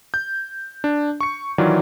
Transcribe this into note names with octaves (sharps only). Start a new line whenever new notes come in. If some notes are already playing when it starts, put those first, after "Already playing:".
G6
D4
C#6 C#7
D#3 E3 F#3 F4 D5